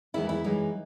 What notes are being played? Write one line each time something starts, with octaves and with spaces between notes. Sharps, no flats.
E2 D#3 G#3 E4
E4
F#2 E3 G#3 D#4